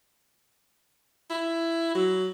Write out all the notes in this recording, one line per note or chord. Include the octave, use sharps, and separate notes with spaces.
E4
F#3